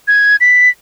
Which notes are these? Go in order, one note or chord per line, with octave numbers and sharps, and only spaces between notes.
G#6
B6